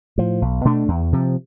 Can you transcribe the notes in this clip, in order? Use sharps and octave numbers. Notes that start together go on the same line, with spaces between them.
A2 F3
B1
B2 A3 D4
E2
C3 F3